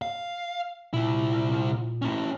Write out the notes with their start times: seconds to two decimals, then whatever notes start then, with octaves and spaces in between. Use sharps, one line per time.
0.02 F5
0.93 C2 A#2 E4
2.02 C#4 E4